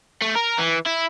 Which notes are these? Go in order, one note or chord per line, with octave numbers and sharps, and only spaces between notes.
A3
A#4
E3
E4